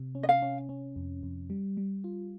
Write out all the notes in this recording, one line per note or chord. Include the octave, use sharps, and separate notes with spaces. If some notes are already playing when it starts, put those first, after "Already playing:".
Already playing: C3
C#4
D#5
F5
C#4
C#4
F2
F2
G3
G3
F4